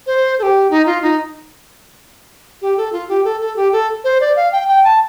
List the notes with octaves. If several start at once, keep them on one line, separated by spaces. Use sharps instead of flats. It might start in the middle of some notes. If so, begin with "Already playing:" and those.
C5
A4
G4
D#4
F4
D#4
G4
A4
F4
G4
A4
A4
G4
A4
C5
D5
F5
G5
G5
A5